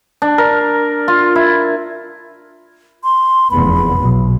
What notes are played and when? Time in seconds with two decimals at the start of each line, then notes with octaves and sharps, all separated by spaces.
0.22 D4
0.38 A#4
1.08 F4
1.36 E4
3.04 C6
3.51 F1 E2 B3 B5
3.97 B1 B2